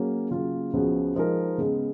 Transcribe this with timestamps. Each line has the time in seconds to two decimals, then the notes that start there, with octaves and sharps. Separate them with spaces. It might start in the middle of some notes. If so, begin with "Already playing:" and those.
Already playing: F#3 A#3 C#4 G#4
0.30 C#3 F#3 A#3 F4
0.73 C#2 C#3 F3 B3 F#4
1.16 F3 G#3 D#4 A#4
1.58 C#3 G#3 B3